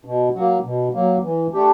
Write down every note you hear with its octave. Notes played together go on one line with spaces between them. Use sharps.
B2
F#3 A#3
B2
F#3 A#3
E3
A3 D4 G4